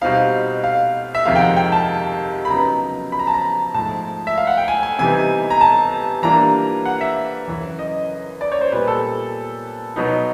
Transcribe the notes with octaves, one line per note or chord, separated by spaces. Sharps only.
B2 G3 C4 D#4 F5
F5
E5
F2 C3 D#3 G#3 F5
G5
F#5
G5
A5
B5
C#3 F#3 B3 D#4 A#5
B5
A#5
A5
A#5
G#2 F3 A3 A5
E5
F5
F#5
G5
G#5
G#5
C3 E3 G3 B3 D#4 G#5
A#5
A5
E3 G3 A#3 D4 F4 A#5
F#5
E5
F#2 C#3 E3
D#5
D5
C#5
C5
A#2 G3 B3 B4
A4
B2 F#3 B3 D#4